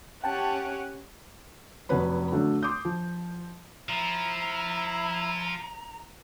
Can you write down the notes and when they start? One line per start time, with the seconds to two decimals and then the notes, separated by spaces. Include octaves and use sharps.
0.24 C#4 G4 F#5 G5 A5
1.89 F1 F#3 B3 C#4 B4 B5
2.32 D3 F#3 A3 D4
2.63 C6 D6 D#6 G6
2.85 F3
3.89 F3 E4 A#5